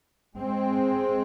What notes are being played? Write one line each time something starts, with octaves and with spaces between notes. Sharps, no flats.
G#3 C4